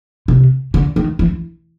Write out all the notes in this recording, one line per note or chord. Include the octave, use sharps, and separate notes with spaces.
C3
D3
D#3
E3